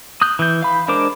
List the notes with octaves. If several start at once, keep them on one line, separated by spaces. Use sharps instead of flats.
D#6 F#6 G6
E3 G6
F5 B5
G#3 D4 A#4 C5 D6